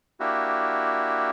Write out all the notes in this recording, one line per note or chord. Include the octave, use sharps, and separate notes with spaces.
A#3 D4 E4 F#4 G4